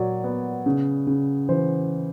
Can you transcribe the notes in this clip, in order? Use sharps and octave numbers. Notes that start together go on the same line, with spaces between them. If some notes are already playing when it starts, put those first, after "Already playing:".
Already playing: A#2 F#3 C#5 D5
B3
C#3
C#3
E3 C5